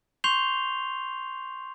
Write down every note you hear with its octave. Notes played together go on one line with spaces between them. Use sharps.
C6 C#6 G6 C7 F7 G7